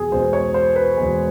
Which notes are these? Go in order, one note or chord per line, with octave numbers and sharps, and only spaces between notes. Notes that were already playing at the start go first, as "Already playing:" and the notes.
Already playing: E2 B2 G#4
E2 B2 G#3 C5
C#5
C5
B4
E2 B2 G#3